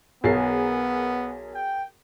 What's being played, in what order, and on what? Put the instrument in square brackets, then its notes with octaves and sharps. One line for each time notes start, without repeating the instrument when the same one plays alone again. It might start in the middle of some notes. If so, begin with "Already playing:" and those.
[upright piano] B1 A6 C7 [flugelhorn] B3 [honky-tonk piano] G#4 A#4
[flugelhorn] G5